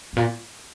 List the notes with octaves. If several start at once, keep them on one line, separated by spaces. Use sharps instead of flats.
G#2
A#2